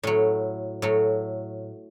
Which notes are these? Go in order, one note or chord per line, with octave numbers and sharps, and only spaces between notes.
A2 F#3
A2 F#3